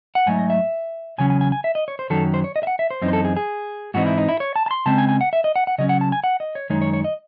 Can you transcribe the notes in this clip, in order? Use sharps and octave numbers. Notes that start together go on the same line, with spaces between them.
F#5
G#2 F#3 A3 D#4 G#5
D#5
E5
E2 C#3 F#3 C#4 G#5
G#5
G#5
G#5
E5
D#5
C#5
C5
F#2 D#3 F#3 C#4 A4
C5
C#5
D#5
E5
F#5
E5
C5
F#2 E3 C4 D#4
C5
A4
G#4
G#4
G#2 E3 C4 D#4 F#4
E4
D#4
E4
C#5
A5
A5
C6
C#3 G#3 C4 A5
G#5
G#5
F#5
E5
D#5
F#5
F#5
C#3 F#3 C#4 D#5
F#5
A5
G#5
F#5
D#5
C#5
F#2 D#3 G#3 D#4 C#5
C#5
C#5
D#5